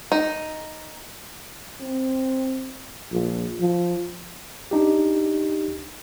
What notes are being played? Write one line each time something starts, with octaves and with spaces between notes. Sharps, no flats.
D#4
C4
A#1
F3
D4 D#4 G4